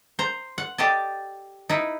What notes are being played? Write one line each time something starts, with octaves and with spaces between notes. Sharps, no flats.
C5 A#5
F#5
G4 A4 D5 D#5 A5
D#4 E4 B4